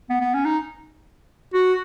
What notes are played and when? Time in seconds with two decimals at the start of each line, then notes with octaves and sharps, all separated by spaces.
0.10 B3
0.21 B3
0.34 C#4
0.45 D#4
1.54 F#4